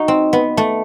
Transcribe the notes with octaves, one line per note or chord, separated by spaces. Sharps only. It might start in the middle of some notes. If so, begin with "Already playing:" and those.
Already playing: D#4 F#4
C4
B3
A3